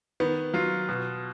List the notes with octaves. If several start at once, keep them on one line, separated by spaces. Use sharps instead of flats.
D#3 B3
F#3 F4
B2